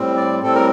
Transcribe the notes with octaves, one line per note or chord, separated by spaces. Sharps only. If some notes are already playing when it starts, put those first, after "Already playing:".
Already playing: A2 G3 C4
D5
A2 G3 C4 A4
A#4